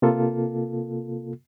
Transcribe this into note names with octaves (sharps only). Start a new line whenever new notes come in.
C3 A#3 F4 A4